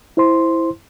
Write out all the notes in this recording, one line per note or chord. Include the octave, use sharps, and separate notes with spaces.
E4 C5 C6